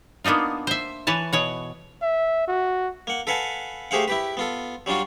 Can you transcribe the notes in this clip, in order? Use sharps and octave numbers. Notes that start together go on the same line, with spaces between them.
A#3 B3 D4 D#4 F4
C5 E5
E3 B4 C#5 A5
B2 C#5 F#5
E5
F#4
A#3 F#5
A4 B4 F5 F#5 G#5 A5
A3 G4 G#4 C5 F5 F#5
E4 G4 B4
B3 F4 A4
F#3 G3 D4 F4 F#4